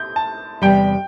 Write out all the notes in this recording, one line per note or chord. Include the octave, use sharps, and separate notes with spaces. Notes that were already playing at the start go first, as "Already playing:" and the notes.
Already playing: G6
A5
E2 C3 G3 G5